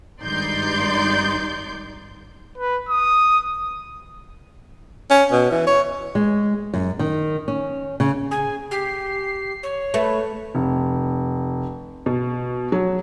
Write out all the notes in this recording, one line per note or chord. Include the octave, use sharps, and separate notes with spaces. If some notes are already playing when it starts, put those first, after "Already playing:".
G#1 G2 D#4 D5 C6 G6
B4
D#6
C#4
B2
E3
C#5
G#3
F#2
D#3
C#4
C#3
G#4 G#5
G4 C7
C#5
A3 B4
F1
B2
F#3